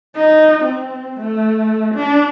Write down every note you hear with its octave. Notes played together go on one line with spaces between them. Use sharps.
D#4
C4
A3
D4